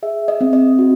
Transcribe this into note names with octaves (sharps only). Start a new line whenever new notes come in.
G#4 E5
D#5
C4
D#5
F#4